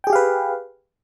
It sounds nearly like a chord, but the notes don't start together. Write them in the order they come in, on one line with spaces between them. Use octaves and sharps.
G5 G#4 G4 F5 B4